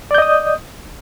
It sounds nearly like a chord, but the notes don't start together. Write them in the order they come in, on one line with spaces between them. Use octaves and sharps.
D5 G6 D#5 D#6